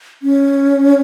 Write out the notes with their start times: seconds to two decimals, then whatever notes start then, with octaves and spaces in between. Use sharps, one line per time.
0.22 C#4